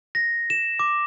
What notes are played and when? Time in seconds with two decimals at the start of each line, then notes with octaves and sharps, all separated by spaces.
0.15 A#6
0.50 E7
0.79 D6